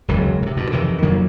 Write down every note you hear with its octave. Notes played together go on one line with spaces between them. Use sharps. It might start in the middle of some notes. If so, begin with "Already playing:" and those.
E1 C#2 F#3
A2 C3
G2 B2
F2 C3 D#3 E3
F2 D#3 F#3 A#3